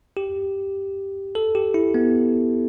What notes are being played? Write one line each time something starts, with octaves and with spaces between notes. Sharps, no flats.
G4
A4
G4
E4
B3